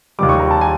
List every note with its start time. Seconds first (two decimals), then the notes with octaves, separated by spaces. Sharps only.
0.19 D#2 D#3 G3 D6
0.29 C#6
0.39 A#5
0.51 A5
0.61 G#5